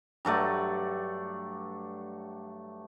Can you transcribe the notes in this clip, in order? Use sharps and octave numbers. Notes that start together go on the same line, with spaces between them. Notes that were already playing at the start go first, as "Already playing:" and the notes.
G2 F#3 A3 D5